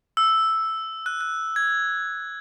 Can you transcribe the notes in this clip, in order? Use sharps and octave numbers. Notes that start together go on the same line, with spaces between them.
E6
F#6
F#6
G#6